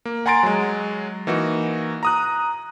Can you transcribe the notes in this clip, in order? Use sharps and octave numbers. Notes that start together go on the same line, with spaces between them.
A#3
F#5 G#5 A#5 C6 A6 D7
F#3 G#3
E3 A#3 D#4 F#4
A#5 D#6 F#6